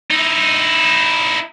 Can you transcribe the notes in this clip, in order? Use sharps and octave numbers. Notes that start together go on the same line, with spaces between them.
D#4 E4